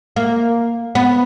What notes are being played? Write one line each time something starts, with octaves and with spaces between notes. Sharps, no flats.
A#3
B3